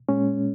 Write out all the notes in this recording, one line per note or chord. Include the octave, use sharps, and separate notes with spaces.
A#2 G#3 C#4